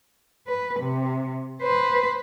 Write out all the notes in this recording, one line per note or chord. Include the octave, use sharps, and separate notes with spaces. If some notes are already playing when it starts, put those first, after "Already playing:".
B4
C3
B4 C5